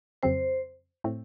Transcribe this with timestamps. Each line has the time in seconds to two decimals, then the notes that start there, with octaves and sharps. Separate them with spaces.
0.23 F2 C#3 F#3 C4 C5
1.04 A2 A3 C4